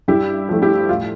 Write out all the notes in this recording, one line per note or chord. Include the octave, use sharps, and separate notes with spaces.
G2 E4 G4
F3 A3
E4 G4
A2 F4